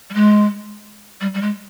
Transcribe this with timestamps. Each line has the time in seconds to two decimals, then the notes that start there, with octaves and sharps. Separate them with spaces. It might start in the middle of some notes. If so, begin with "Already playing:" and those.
0.10 G3
0.14 G#3
1.21 G3
1.34 G3
1.42 G#3